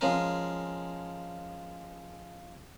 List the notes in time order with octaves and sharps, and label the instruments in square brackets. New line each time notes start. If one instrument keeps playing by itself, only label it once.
[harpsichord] F3 G#3 C#4 A#4